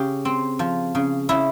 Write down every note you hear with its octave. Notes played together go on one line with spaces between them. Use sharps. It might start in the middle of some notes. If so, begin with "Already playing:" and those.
Already playing: C#3 G4
C4
F3
C#3
C#3 E4